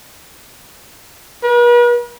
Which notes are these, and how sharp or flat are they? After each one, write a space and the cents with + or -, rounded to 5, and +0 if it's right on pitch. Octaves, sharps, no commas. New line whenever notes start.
B4 -45